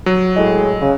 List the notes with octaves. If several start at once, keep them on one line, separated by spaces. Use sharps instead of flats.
F#3
A2 G#3
C#3